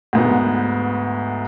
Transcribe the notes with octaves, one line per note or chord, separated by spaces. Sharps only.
D2 G#2 B3